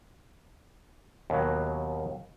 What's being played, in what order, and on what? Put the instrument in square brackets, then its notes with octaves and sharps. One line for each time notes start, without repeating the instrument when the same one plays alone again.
[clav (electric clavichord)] D#2 B2 F#3